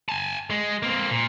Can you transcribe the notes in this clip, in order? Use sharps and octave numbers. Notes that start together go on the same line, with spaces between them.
G#5 A5
G#3
A#3 C4
A#2